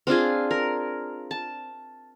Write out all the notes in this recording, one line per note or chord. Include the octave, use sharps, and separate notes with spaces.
C4 D4 F4 G#4
A#4
A5